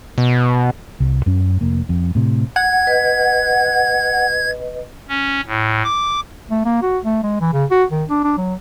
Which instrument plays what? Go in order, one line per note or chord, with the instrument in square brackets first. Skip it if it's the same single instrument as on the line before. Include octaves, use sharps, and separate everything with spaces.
[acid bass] B2
[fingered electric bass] C2
F#2 C#4
F1 A#3
F2
A2 C3
[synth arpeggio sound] F#5 [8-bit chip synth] G#6
[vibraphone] B4 D#5
[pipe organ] C#4
A2
D6
[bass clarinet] A3
A#3
F#4
A3
G#3
E3
C#3
F#4
D#3
D4
D4
F#3